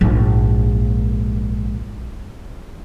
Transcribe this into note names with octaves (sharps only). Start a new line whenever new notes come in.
A#1 G#2